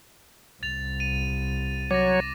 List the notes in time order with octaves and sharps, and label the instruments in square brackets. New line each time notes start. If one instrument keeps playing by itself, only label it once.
[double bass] C2 [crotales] A6 F7
[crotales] D#7
[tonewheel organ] F#3 C#5 [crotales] D6 A6 A#6